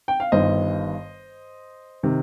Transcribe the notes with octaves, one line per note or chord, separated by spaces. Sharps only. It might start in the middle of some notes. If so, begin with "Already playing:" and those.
G5
F5
G1 G2 D#3 C5 D#5
C3 D#3